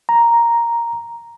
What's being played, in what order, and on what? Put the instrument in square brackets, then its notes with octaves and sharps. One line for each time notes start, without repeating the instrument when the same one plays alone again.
[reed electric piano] A#5